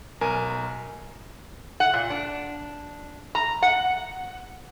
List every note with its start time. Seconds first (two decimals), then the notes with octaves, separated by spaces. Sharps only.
0.21 B1 A#4 G#5
1.80 F#5
1.93 A#2
2.10 D4
3.35 A#5
3.62 F#5